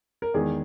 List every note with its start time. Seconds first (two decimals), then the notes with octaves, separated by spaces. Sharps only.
0.22 A#4
0.34 E2 D#3 G#3 G#4